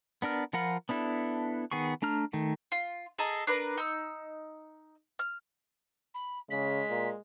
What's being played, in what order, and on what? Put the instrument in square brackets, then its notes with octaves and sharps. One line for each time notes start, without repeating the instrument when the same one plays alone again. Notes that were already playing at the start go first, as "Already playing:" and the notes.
[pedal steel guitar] B3 D4 A#4 F6
F3 F4 A#4 F#5 B5
B3 D4 E4 A4
D#3 B3 G#4 C#6
A3 D4 A#5 F6
D#3 A3
[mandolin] F4
G#4 A4 D#5 A#5
D4 A#4 B4
D#4 E6
F6
[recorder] B5
[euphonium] C#3 [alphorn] G#3 [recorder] B6
[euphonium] A#2